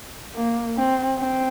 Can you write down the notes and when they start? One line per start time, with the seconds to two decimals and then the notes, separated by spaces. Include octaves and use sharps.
0.35 A#3
0.77 C4
1.18 C4